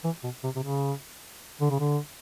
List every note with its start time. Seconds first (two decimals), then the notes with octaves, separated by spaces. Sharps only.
0.04 E3
0.23 B2
0.43 C3
0.55 C3
0.63 C#3
1.61 D3
1.70 C#3
1.80 D3